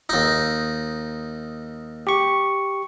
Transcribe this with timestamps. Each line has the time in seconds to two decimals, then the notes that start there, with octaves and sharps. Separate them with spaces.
0.09 D#2 D#4
2.07 G4 C#6